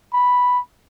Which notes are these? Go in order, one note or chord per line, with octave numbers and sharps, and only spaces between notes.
B5